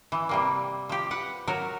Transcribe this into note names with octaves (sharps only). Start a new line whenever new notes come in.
E3
C3 G3 A#3
F3 G4
B4 F#5
F#3 A#4 C#5